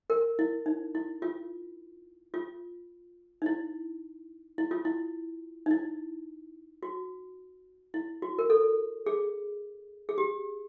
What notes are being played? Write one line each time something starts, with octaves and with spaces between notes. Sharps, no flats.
A#4
E4
D#4
E4
F4
F4
D#4
E4
E4
F4
E4
D#4
E4
F#4
E4
F#4
A#4
A4
G#4
G#4
G4